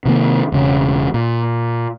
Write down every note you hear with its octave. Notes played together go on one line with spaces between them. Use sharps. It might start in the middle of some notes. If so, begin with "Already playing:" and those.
C3 D#3 A#3
E1 C#3
A#2